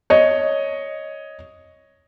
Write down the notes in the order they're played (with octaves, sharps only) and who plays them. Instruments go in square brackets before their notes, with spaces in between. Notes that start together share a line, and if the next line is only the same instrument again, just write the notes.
[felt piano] C#5 D#5